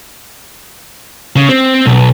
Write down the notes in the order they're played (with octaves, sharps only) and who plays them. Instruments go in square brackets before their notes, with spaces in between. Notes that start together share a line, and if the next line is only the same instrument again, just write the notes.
[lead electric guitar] C#3
C4
B1